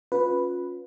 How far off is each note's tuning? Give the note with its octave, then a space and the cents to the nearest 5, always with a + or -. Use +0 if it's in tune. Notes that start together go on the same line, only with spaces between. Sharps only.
C#4 +0 F4 +35 B4 +0